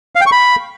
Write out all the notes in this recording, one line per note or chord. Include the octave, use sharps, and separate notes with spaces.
F5
G5
C#6
B5